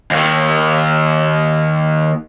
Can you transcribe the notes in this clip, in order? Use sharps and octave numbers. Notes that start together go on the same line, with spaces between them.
D#2 D#3